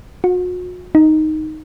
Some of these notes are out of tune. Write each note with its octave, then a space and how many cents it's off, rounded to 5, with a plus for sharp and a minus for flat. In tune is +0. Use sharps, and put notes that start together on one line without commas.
F#4 -40
D#4 +0